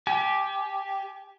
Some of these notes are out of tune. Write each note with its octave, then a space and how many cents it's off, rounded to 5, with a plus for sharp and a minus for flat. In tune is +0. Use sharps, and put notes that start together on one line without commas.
G4 +0 G#5 +40